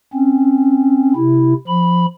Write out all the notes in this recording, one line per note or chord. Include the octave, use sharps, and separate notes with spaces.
C4 C#4
C3 E4
F3 B5